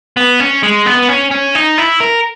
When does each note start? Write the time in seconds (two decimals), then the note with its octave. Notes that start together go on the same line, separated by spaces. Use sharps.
0.17 B3
0.40 C#4
0.63 G#3
0.86 B3
1.09 C#4
1.31 C#4
1.55 D#4
1.78 E4
2.00 A#4